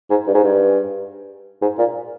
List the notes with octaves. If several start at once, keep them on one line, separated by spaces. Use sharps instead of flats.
G#2
G2
G#2
G2
G#2
A#2